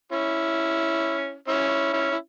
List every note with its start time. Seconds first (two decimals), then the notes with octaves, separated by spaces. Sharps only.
0.12 C#4 E4
1.48 C#4 E4
1.93 C#4 E4
2.12 E4